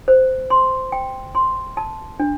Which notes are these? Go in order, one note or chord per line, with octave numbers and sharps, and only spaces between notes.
C5
C6
G5
C6
A5
D4